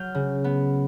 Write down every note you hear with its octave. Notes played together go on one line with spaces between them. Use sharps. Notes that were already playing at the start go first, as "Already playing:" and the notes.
Already playing: F#3 F6 G6
C#3
B3